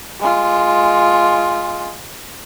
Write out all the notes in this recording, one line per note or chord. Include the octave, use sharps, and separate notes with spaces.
G#3 F4